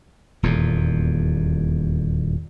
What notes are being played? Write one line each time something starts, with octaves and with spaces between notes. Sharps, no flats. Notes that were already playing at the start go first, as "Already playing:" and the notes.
D#1 E2 A#2